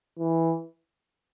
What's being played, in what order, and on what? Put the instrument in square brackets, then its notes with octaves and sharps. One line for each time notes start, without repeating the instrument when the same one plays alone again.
[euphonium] E3